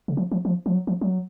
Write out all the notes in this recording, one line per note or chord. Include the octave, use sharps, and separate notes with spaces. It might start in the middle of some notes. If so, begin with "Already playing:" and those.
C#3
F3
F3
F3
F3
F#3
F3
F#3